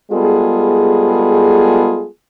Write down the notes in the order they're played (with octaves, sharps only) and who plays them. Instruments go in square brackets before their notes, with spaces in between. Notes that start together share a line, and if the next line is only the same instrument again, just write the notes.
[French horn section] G3 G#3 B3 F4 G#4 A4